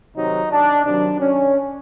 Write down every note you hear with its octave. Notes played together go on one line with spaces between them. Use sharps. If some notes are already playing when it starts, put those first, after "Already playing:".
C3 D#3 F#3 D#4
D4
C3 D#3 F#3 D4
C#4